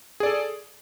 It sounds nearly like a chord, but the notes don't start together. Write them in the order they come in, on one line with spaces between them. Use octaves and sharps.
G#4 D5 A4